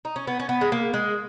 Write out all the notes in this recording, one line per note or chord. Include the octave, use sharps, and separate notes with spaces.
D#4
C#4
B3
C#4
B3
G#3
A#3
G#3